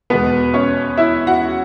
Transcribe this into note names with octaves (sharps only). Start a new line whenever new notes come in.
E2 B2 G#3 B3 B4
C#4 C#5
E4 E5
F#4 F#5